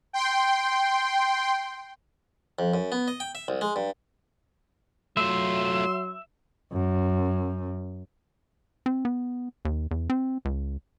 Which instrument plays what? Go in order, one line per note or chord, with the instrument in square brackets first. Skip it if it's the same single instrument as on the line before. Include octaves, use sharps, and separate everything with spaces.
[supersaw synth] G5 C6
[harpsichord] F2
F#2
B3
D#5
G5
E5
C2
G#3
G2
[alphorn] F#3 [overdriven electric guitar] A3 F4 [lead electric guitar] E5 [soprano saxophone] C6
[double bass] F#2
[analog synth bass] C4
B3
D#2
E2
C4
C#2